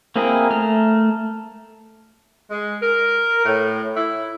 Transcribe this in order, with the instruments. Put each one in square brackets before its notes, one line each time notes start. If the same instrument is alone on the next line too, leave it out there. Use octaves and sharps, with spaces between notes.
[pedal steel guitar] A#3 C4 E4 G#4 A#4
A3 A#5 F6
[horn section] G#3
A#4
A2
E4